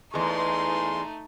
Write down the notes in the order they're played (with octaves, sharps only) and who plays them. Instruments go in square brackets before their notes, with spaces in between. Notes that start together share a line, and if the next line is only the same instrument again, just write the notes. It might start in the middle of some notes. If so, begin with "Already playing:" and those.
[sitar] E2 G#3 [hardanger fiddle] A3 D#4 [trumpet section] C6